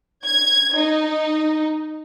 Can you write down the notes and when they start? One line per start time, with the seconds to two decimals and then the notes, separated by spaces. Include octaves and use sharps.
0.24 G#6
0.75 D#4